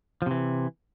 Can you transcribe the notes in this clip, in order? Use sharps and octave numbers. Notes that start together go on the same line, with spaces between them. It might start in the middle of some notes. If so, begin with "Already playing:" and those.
C3 E3 F3